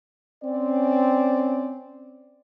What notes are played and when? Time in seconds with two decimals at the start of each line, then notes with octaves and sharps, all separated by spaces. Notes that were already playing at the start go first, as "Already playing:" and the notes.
0.43 C4 C#4 D5